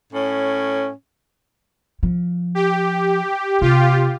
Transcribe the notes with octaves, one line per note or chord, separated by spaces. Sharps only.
A2 C#4
F3
G4
C3 F4 G4